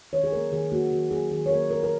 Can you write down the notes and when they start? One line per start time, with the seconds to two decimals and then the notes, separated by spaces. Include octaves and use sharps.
0.12 D#3 C#5
0.24 G#4
0.32 F#3 A#3 A#4
0.52 D#3 G#4
0.72 F#3 A#3 F#4
0.91 D#3 F#4
1.11 F#3 A#3 G#4
1.31 D#3 G#4
1.46 C#5
1.51 F#3 A#3 A#4
1.70 A#2 A#4
1.83 A#4